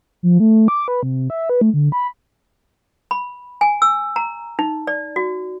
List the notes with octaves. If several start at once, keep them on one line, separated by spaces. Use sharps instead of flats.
F3
A3
D6
B4
C3
E5
B4
A3
D3
B5
B5
G#5
E6
A#5
D#4
D5
F#4